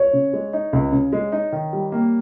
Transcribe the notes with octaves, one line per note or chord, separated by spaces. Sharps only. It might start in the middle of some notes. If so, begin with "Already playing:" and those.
Already playing: C#5
C#3
G#3
D#4
C#2
C#3
G#3
D#4
D#3
G3
A#3